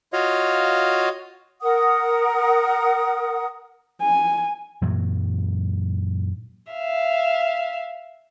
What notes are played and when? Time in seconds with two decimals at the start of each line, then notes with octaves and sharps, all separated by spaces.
0.13 F4 F#4 C#5 D#5 F5
1.62 A#4 F#5 D#6
4.01 G#5
4.82 F#2 A#2 E3 F#3
6.72 E5 F5